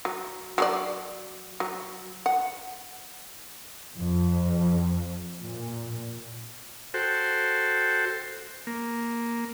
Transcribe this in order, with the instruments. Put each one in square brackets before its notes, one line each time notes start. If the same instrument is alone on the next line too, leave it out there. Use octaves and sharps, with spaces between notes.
[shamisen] F#3
F#3 G#4 D5
F#3
F#5
[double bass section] F2
A#2
[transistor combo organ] F#4 A4 C5 G5
A#3